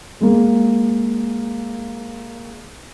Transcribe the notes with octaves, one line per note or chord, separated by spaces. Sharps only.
G#3 A#3